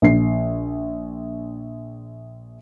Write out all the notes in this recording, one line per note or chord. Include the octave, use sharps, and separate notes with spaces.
A#1 C7